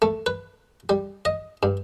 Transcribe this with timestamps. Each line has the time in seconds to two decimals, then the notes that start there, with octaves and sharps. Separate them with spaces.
0.02 A3
0.26 B4
0.89 G3
1.25 D#5
1.63 G2